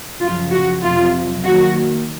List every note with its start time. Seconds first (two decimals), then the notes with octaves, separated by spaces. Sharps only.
0.21 F#2 C#3 F3 F4
0.53 F#4
0.83 F2 C3 F#3 F4
1.44 D#3 F#3 A#3 F#4